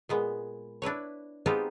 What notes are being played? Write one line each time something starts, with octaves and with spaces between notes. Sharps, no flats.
A#2 G#3 B3
D4 E4 B4 C#5
G#3 B3 C4 D#4 F4 G4